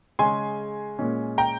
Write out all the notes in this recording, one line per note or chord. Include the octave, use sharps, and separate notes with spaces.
C#3 G#3 C#4 G#5 C6
A#2 G#3 C#4
G5 A#5